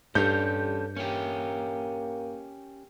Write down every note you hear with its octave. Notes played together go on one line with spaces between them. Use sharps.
G2 G3 C#4 A4 G6
A#3 C#4 G4